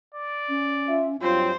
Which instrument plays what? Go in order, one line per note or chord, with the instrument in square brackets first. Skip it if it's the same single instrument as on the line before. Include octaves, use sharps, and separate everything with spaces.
[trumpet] D5
[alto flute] C#4
[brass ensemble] F4 E5
[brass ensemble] G2 F#3 F4 [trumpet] C4 [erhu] C5 [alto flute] C#5